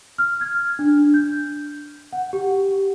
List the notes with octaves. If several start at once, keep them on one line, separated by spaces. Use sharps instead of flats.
F6
G#6
D4
G6
F#5
G4